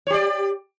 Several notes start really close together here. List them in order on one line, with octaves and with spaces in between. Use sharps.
C#5 G4 D5